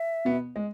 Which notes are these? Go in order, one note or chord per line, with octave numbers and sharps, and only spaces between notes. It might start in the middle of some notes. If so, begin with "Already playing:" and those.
Already playing: E5
B2 B3
G#3